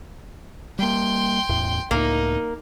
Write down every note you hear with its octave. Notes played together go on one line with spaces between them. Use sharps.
G3 A#3 G5 C6
E1 E2 A2
C#2 A2 A#3 D#4